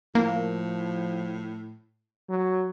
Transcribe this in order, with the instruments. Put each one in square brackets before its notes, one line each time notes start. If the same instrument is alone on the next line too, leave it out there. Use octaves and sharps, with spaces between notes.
[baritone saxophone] A2 [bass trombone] F3 [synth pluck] A#3
[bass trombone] F#3